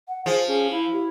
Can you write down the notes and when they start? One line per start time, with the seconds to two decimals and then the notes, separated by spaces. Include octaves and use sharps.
0.08 F#5
0.26 F3 G#4 C5
0.47 C#4 G#4
0.71 E4 F5
0.93 G4